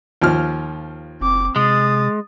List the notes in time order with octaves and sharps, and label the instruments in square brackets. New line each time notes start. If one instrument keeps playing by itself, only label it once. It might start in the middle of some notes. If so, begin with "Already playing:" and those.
[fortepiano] D#2 F3 F6
[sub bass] F#1 [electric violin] C4 D6
[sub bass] C3 [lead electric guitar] G#3 [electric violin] D#6 A6